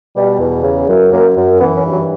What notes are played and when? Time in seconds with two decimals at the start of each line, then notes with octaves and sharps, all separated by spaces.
0.16 B2 G3
0.40 E2
0.63 C#3
0.88 F#2
1.12 F#2 A#3
1.36 F#2
1.60 E3 B3
1.75 C#4
1.84 G2
1.92 F#3